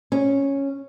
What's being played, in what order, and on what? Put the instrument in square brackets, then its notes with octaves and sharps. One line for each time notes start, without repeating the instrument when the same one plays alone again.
[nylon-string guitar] C#4